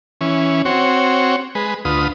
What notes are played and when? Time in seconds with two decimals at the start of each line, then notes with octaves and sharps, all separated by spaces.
0.21 E3 C#4
0.65 C4 F#4 C#5
1.55 G#3 B4
1.85 D2 F4 B4 D#6